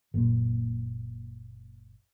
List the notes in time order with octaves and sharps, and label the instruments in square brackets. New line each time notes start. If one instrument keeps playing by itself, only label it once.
[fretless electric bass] F#1 A#2